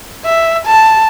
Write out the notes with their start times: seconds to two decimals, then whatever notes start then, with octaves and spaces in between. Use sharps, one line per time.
0.25 E5
0.66 A5